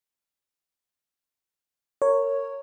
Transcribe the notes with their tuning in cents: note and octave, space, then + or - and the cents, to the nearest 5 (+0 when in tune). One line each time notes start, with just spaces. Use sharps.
A#4 -25 C#5 +0